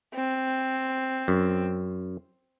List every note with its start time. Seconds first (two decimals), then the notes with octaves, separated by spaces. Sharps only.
0.15 C4
1.28 F#2